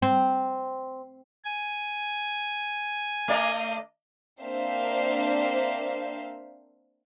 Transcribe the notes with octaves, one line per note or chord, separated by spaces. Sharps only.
C4
G#5
A3 D5 D#5
A#3 C4 D4 C5 E5 F5